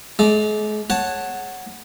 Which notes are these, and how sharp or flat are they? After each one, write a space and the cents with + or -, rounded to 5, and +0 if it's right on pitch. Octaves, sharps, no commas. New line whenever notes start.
G#3 +40 D5 +0
C#5 -15 F#5 +0 A5 +0